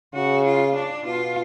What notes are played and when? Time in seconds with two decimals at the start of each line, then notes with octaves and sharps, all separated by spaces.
0.14 C#3 F#4
0.45 F4
0.75 D4
1.06 B2 F4